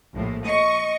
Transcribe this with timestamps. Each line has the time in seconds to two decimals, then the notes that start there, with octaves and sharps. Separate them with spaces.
0.13 A#1 A2
0.45 D#5 C#6